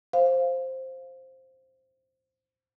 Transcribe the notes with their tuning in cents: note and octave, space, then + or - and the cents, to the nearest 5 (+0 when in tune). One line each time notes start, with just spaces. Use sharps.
C5 +5 F5 +0